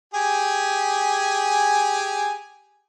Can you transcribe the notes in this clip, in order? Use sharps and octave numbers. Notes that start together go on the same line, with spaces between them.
G4 G#4 G#5